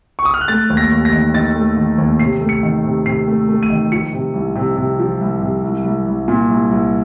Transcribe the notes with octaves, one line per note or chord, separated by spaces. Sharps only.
C#6
D#6
F6
F#6
A3 A6
D#2
A#6
D#2
A#6
D#3
D#3 A6
A3
D#3
D#2
C3 C7
A3
C#7
D#3
C3
C3 C7
A3
A3
D#7
D#3
F3 C#7
C3
C2
C3
C3
F3
C2
C3
C2
C2
C2
A#2
C2
C2